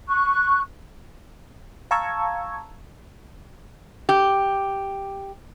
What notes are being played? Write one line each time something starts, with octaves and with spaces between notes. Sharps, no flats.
C#6 F#6
F5 A5 A#5 C#6 E6 G#6
G4